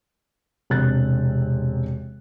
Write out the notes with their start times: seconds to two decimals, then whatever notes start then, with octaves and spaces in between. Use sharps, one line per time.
0.70 E1 C3 D4 A#4 F#6 A6